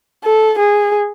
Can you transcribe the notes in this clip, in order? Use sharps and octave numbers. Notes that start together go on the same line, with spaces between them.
A4
G#4